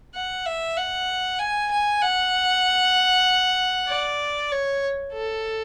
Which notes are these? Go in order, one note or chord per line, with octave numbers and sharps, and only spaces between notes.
F#5
E5
F#5
G#5
G#5
F#5
D5
C#5
A4